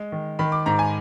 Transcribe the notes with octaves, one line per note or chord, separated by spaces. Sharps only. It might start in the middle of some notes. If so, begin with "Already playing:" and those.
Already playing: G#3
D#3
D#3 B5
D6
G#2 A#5
G#5